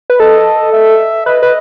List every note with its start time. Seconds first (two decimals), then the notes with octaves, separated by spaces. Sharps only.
0.10 B4
0.20 A4 D#5
0.72 E5
1.26 B4 D#5
1.42 B4